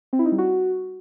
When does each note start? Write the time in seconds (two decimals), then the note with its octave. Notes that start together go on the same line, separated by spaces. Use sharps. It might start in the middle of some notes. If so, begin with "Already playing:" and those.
0.13 C4
0.19 E4
0.26 D#4
0.32 G3
0.38 F#4